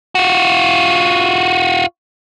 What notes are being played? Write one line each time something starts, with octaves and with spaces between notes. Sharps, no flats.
F4 F#4